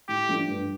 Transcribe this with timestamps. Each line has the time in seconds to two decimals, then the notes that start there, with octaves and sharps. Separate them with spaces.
0.08 A2 G4
0.28 F3 A3 D4
0.48 G2